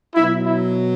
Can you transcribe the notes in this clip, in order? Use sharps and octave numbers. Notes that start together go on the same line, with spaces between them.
B2 F#3 E4
E4